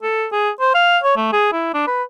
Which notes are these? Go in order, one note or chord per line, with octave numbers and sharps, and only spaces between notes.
A4
G#4
C5
F5
C#5
A3
G#4
E4
D4
B4